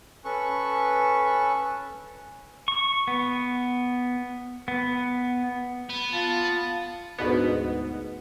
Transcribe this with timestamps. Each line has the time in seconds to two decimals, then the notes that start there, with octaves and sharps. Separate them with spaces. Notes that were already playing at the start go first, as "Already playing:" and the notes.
0.25 C#4 A4 B4 C#6
2.68 C#6
3.08 B3
4.68 B3
5.89 B3
6.13 F4 A5
7.18 D2 G#2 B2 B3